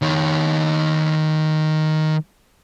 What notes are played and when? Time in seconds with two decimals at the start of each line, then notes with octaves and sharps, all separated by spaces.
0.02 D#3 C#5